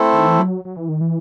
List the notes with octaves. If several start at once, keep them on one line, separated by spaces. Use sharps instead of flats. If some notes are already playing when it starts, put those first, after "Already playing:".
Already playing: A3 C4 E4 A4
D#3
E3
F#3
F#3
E3
D#3
E3